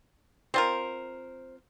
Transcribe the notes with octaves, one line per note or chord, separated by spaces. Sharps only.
C4 F4 A#4 C5